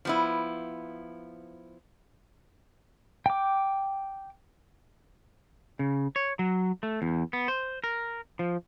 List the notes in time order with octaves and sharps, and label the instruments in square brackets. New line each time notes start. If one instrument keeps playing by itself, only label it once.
[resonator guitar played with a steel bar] F3 B3 E4
[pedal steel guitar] G5 D6
[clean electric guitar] C#3
C#5
F#3
A3
E2
B3
C5
A#4
F3